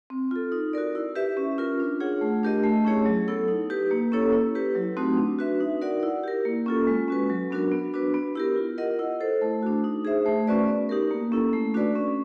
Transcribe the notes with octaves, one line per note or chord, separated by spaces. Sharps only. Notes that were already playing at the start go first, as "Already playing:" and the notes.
C4
F4 A4
D#4
F#4 A#4 D5
E4
G4 B4 E5
C#4
F4 A#4
D4
F4 G#4 C#5 F#5
A3
D4 G4 A#4 D#5
A3
C#4 E4 G#4 C#5
F#3
B3 E4 A4
D#4
G4 B4
A#3
C#4 E4 A4 C#5
E4
G4 B4
F#3
A3 C4 D#4 F#4
D4
F#4 B4 E5
D#4
F#4 A#4 D5 F#5
E4
G4 A#4
A#3
C#4 F4 A4
G#3
C#4 F#4 B4
F#3
B3 D4 F#4 A#4
B3
D4 F#4 B4
B3
E4 G4 A#4
F4
A#4 D#5 F#5
E4
A4 C5
A3
D4 F#4
D#4
G#4 C5 E5
A3
C#4 F#4 B4 D5
B3
D#4 G4 A#4
A#3
C#4 E4 A4
A3
D4 F#4 B4 D5
C#4